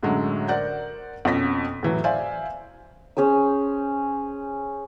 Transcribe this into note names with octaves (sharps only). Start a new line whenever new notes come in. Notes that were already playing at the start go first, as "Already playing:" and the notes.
F#2 A2 D3 F#3 G#3
A#4 C5 D5 F#5 G6
F2 B2 C#4 A#6 B6
A2 E3 F#3
C5 D5 E5 F5 G#5
C#4 G#4 C5 E6